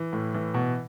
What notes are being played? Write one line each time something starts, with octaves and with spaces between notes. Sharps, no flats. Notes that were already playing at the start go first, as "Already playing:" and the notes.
Already playing: E3
A2
E3
B2